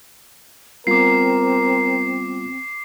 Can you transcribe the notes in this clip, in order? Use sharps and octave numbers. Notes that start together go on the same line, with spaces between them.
G3 B3 C4 F4 A#4 D6 C7